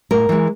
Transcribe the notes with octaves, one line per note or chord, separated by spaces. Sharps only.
A2 A#4
E3 G#3